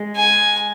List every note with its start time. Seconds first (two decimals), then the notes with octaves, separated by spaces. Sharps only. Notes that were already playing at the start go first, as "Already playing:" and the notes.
Already playing: G#3
0.16 G#5